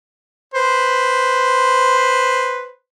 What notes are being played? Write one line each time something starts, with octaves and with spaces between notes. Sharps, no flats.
B4 C5